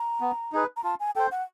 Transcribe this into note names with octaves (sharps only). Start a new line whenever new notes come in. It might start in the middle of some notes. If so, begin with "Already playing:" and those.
Already playing: A#5
B3
D#4 G#4 B4
A#5
F4 A5
G#5
A4 C5 G5
F#5